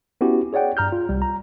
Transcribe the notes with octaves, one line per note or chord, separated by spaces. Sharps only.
B3 C#4 E4 F#4 G4
G#4 C#5 D5 F#5 G5
G2 A#5 F6 G6
F4
C2 G3
A#5